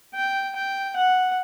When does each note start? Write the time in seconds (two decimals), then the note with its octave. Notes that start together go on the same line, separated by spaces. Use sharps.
0.15 G5
0.55 G5
0.96 F#5